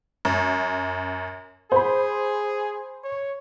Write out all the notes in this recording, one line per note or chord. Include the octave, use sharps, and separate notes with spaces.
F#2
G#4 C5 B5
C#5